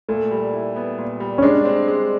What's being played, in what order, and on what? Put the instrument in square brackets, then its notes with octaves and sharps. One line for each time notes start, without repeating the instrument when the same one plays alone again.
[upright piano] A#2 [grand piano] A3
[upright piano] G3
E4
B3
A#2
G3
[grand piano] C#4
[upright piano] G#3 [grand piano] D4
[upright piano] C4
G#3